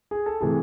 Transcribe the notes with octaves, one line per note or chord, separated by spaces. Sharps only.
G#4
A4
C3 E3 A3 G#4